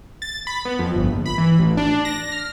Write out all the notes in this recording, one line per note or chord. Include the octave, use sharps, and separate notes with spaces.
A6
B5
B3
F2
G1
A#1
B5
E3
A1
D4
A#6
F6